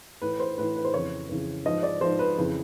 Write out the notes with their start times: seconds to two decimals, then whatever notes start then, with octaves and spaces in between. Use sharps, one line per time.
0.22 A2 E3 B4
0.40 C5
0.58 A2 E3 B4
0.76 B4
0.85 C5
0.94 F2 C#3 E3 C#5
1.29 F2 C#3 E3
1.66 G#2 F3 D#5
1.83 D5
2.01 G#2 F3 C5
2.19 B4
2.37 F2 C#3 E3